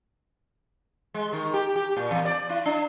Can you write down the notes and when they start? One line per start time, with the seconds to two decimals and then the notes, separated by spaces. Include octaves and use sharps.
1.14 G#3
1.33 D#3
1.54 G4
1.76 G4
1.97 A#2
2.11 E2
2.25 D5
2.49 E4
2.66 D4